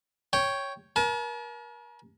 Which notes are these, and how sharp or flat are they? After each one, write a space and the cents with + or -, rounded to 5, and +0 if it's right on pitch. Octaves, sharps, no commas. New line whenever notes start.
C#5 +0 G5 +0
A#4 +35 A5 -45